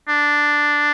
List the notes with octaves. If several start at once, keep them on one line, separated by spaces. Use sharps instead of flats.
D4